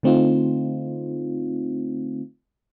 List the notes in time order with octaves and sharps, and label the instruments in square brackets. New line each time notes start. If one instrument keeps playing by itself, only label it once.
[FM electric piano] D3 A3 C4 D#4 F4